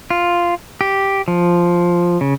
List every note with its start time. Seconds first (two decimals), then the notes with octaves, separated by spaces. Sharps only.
0.10 F4
0.81 G4
1.28 F3
2.21 C#3